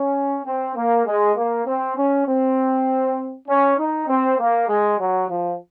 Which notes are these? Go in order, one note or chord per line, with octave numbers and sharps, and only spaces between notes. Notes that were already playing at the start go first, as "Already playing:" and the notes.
Already playing: C#4
C4
A#3
G#3
A#3
C4
C#4
C4
C#4
D#4
C4
A#3
G#3
F#3
F3